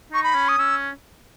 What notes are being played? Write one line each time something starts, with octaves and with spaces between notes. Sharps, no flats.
D#4 C#6
B5
C#4
D#6
C#4 E6